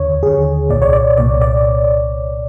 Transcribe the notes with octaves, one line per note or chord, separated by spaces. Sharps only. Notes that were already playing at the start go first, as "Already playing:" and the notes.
Already playing: D#2 D3 C#5
D#2 D3 G#4
C2 A#2 D5
C#5
D5
C2 A#2 D5
D5